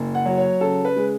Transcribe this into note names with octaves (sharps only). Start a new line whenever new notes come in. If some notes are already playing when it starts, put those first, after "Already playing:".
Already playing: F#1
F#5
F#3
C#5
C#3 A4
B4
G#3